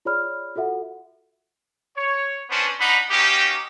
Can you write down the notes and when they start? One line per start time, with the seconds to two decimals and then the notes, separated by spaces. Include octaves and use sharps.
0.05 F4 G#4 C#5 D5 B5 F6
0.56 F4 F#4 A4 E5 F#5
1.97 C#5
2.50 B3 C#4 D4 F#4 B4 C5
2.80 D4 D#4 F#5 A#5 B5
3.10 A#3 C#4 D#4 F#4 G4